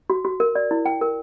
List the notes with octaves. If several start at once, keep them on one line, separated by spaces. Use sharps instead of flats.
F#4
F#4
A#4
D5
E4
G5
A#4